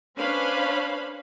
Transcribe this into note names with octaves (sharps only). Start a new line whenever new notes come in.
C#4 D4 B4 C5 F5 B5